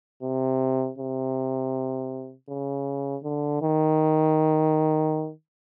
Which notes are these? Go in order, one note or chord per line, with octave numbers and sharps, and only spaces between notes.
C3
C3
C#3
D3
D#3